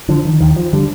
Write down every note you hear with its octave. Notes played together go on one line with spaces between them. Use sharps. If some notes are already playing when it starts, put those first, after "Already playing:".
D3 F3
D#3
D#2 D#3
F3
D3 G3